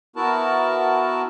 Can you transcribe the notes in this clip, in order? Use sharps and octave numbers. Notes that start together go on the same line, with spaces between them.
B3 E4 F#4 A#4 A5